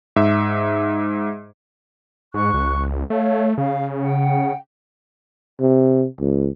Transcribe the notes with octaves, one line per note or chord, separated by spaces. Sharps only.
G#2 E5
G#2 C#6 F#6
C#2
A3 C#5 F5
C#3 F5
F#5 G5
C3
C#2